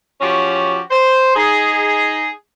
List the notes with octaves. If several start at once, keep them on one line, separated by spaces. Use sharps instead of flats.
F3 C#4 F#4 G4
C5
D#4 G#4